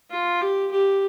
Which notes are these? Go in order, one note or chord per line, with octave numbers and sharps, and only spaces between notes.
F4
G4
G4